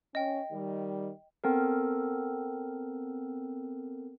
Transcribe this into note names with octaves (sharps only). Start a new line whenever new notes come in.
C#4 D#5 G5
D#3 G3
B3 C4 A4 A#4